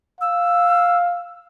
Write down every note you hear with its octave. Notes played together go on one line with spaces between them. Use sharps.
F5 E6